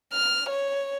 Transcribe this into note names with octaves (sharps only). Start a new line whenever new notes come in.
F6
C#5